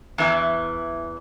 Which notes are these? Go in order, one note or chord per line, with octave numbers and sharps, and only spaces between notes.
E2 E3